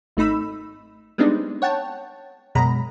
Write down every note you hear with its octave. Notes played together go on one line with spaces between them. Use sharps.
G#1 A3 D#4 B5 E6
G3 G#3 B3 C4 D4 D#4
C#5 F#5 G5 A5
F#2 B2 G#3 A#5 B5